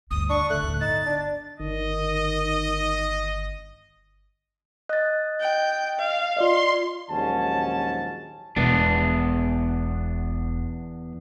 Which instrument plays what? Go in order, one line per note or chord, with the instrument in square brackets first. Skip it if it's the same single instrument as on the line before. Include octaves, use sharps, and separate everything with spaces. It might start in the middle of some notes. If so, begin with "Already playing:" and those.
[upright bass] D2 G2 [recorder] D#6
[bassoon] D4 [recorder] C#6
[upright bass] D3 D4 [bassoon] A3 [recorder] F#6
[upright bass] D2 A2
[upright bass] G1 [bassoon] D#4 [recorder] A6
[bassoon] D4
[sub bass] G1 [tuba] D#3 [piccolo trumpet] D#5
[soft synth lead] D#5 [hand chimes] F#6 A6
[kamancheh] G5
F5
[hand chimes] F4 D5 D#5 [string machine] C6
[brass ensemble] A#1 D#2 G#2 F#3 C#4 A5
[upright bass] E1 [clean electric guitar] E2 B3 D4